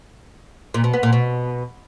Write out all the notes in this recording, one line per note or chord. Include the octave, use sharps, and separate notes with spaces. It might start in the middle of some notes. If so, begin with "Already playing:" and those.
A#2
B2
B3
A#2
B2